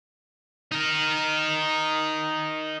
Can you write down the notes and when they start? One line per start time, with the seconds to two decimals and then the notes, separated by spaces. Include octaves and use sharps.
0.72 D#4 A#4